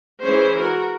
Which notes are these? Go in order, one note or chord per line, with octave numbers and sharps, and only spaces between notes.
E3 G#3 C#4 C5
F#4 A#4